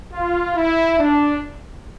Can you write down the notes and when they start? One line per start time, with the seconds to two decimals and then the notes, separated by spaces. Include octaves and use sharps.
0.13 F4
0.56 E4
0.99 D4